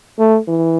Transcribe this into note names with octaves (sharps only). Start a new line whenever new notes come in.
A3
E3